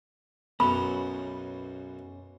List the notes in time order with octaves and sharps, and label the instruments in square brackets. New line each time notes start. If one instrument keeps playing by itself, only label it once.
[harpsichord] B1 F#2 F#3 [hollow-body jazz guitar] B3 C#4 [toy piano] B5